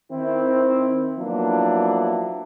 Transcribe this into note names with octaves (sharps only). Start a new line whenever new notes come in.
D#3 C4 E4
F3 F#3 A#3 B3 D4 E4